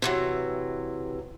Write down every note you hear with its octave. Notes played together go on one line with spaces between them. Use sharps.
C3 E3 F#3